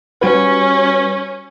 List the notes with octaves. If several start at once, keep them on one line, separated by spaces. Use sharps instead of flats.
G3 C#4 F#4 B4